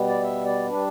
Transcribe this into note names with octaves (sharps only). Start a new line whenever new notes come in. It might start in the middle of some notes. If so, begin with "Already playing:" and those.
Already playing: B2 G3 B3
D5
E5
D5
G3 D4 B4